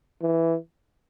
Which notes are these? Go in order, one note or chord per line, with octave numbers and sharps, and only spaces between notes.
E3